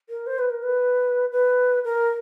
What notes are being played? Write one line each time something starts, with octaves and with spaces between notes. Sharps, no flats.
A#4
C5
B4
A#4
B4
B4
A#4